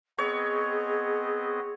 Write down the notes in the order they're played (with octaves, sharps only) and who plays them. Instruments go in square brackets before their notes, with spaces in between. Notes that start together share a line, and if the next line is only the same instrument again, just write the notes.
[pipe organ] B3 C4 D#5 [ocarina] G#4 [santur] C#5